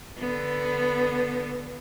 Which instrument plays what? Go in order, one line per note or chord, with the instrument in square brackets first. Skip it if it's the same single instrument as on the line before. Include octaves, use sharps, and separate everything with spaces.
[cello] D3 B3